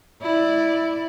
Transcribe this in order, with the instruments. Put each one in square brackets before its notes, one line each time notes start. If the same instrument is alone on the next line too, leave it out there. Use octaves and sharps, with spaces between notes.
[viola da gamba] E4 D5